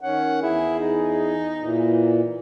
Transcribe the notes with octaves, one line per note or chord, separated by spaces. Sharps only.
D#3 C#4 F#5
E2 E4 G#4
D#4
A#2 E3